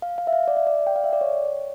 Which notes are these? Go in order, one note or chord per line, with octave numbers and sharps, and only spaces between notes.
F5
F5
E5
F5
D5
E5
D5
G5
F5
E5
D5
C#5